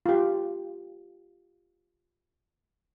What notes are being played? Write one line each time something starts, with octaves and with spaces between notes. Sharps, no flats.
F4 G4